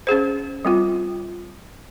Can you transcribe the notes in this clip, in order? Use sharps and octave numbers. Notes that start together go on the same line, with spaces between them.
C#4 G#4 C5
G3 C4 F4